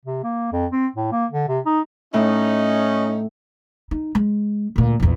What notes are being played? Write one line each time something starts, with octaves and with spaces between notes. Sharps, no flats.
C3
A#3
F2
C4
A2
A#3
D3
C3
D#4
A2 C#4 D#4
D#4
G#3
D2 A#2
A#1 E2